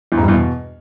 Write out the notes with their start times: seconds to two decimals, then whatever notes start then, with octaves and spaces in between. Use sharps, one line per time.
0.12 E2
0.17 G#2
0.23 G2
0.28 E2
0.34 B2